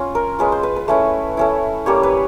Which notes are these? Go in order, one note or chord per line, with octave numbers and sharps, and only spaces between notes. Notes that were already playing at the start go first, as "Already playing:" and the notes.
Already playing: C#4 F4
A#4
G#3 C#4 F4 B4
C5
B4
B4
A3 C#4 E4
A3 C#4 E4
G3 A#3 C#4 C#5
B4